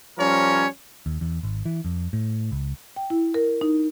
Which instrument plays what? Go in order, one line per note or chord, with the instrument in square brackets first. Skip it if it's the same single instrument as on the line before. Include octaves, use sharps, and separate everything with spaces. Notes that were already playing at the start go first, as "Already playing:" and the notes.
[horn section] F3 G3 C#4 A#4 C#5
[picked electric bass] D#2
E2
G#1
E3
F2
A2
C#2
[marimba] G5
E4
A#4
D#4